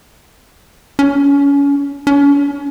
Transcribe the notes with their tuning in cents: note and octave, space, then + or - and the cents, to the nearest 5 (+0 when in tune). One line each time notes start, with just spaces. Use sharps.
C#4 +30
C#4 +45